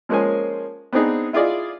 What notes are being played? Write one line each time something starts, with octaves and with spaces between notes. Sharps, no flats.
F3 G#3 A#3 C#4 C5 G#5
B3 C4 D4 D#4 G#4
E4 F4 G#4 D5 D#5